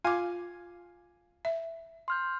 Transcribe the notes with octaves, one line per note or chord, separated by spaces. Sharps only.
F4 F5 G#5 D6
E5
C6 F6 G6